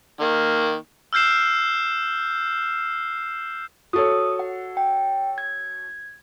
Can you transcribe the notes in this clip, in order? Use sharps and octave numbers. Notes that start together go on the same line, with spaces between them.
D#3 A#3
E6 F6 G6 C7 E7
F#4 A4 C#5 D#6
F#5
G5
G#6